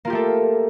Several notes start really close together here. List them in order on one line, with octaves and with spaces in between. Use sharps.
A#3 F4 G4 A3 A4